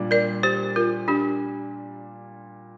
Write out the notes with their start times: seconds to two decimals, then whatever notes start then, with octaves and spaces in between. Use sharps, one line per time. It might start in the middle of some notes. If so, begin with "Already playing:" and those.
Already playing: A#2 G3 D4 F4
0.11 A#4 D5
0.43 G4 C5
0.76 F4 A#4
1.08 D4 G4